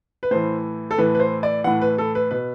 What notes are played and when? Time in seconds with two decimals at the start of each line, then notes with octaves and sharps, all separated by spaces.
0.23 B4
0.31 A2 E3 C5
0.91 A4
0.98 A2 E3 B4
1.15 B4
1.20 C5
1.43 D5
1.64 A2 E3 F#5
1.81 B4
1.98 A4
2.15 B4
2.31 B2 B4